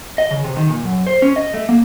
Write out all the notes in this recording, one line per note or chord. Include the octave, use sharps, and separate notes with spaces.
D#5
C#3
C3
D#3
A#2
F#2
C5
C#4
D#5
A3
A#3